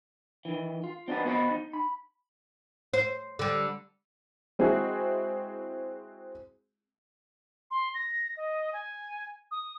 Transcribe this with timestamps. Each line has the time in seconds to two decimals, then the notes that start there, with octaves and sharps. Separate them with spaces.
0.45 D#3 E3
0.84 F4
1.08 C4 D4 D#4 F#4 B4
1.25 B3 F#4 C5 D#5 F#5 B5
1.50 D#4
1.73 B5
2.94 C5
3.39 D3 G3
4.59 G#3 C4 E4 F#4 G#4
7.71 C6
7.94 A#6
8.37 D#5
8.73 G#5
9.51 D#6